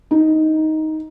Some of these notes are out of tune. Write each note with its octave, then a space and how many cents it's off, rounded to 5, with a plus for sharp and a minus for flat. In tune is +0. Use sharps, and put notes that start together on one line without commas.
D#4 +10